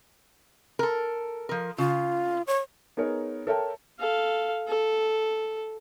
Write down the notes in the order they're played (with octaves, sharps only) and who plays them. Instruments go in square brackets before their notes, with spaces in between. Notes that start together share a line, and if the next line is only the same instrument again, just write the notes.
[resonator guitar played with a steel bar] A4 A#4
F3 A#4
[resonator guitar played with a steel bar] C#3 [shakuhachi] F4
[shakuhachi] C#5
[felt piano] B3 D#4 G#4 A#4 C#5
A4 A#4 C#5 E5 G5 A5
[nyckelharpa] A4 F5
A4